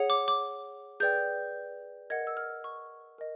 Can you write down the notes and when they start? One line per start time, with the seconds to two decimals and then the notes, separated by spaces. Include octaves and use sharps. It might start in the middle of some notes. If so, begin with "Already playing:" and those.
Already playing: G#4 C#5 F#5
0.10 D6
0.28 D6
1.00 G#4 B4 D5 G5 G6
2.10 A#4 D#5 F#5 G#6
2.27 E6
2.37 F6
2.64 C#6
3.18 A#4 D#5